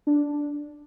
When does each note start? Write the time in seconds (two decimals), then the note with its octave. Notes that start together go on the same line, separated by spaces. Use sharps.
0.07 D4